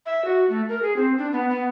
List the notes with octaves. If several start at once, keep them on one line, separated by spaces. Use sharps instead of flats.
E5
F#4
A3
A#4
G#4
C4
D4
B3
B3